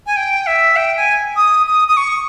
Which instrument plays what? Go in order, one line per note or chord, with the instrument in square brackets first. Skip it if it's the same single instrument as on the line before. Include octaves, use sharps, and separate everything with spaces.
[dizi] G#5
G5
E5
G5
G#5
D#6
D#6
D#6
C#6